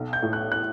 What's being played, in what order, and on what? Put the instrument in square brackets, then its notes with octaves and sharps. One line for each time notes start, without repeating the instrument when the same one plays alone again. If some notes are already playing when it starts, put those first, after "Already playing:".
Already playing: [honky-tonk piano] B1
[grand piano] G6
[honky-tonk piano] A2
[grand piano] F#6
F#6